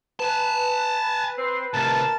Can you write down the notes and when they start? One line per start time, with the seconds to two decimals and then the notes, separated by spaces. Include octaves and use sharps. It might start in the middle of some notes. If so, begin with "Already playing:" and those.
0.20 B4 G#5 A5
1.37 C4
1.74 A2 C3 A#4 A5